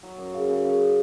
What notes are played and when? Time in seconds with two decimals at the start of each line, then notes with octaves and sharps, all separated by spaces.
0.03 F#3
0.18 F#2
0.34 C#3
0.50 C#3
0.64 C#3